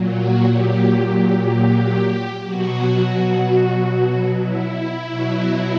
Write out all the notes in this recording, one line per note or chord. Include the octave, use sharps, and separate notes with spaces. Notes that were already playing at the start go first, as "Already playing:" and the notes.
Already playing: A#2 F#3
F#4
G4
B2 F#3 F#4
E4
B2 F#3